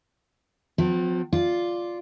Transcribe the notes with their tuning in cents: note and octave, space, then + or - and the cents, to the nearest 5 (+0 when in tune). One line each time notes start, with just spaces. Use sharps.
F3 +40 C4 -35
F4 +0 D5 +0